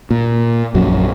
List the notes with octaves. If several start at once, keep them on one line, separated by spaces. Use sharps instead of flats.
A#2
A#1 F#2 F#3